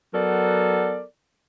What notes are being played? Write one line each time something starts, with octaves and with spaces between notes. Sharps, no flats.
F#3 B3 A4 A#4 D5